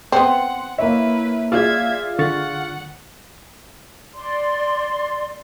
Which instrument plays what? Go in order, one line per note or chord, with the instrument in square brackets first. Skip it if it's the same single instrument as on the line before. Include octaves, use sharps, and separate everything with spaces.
[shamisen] B3 C4 [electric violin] F#5 [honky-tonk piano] C6
[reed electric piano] A#3 C#5 [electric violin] E4 B4 [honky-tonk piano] A#4 E5
[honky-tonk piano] F4 G#4 D5 [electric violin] E5 G#6
[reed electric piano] D3 C#6 A6 [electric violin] F#5
[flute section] D5 C6